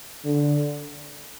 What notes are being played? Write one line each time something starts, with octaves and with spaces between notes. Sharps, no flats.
D3